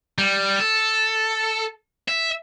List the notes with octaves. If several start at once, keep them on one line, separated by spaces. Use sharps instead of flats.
G3
A4
E5